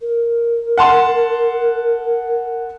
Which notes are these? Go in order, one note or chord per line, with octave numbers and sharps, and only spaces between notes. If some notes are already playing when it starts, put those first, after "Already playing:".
A#4
F#5 A5 C6